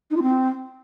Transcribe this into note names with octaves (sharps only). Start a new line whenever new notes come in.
D#4
F4
C4